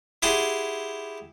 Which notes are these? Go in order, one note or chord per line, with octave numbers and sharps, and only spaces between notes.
E4 G4 G#4 F#5 A5 C6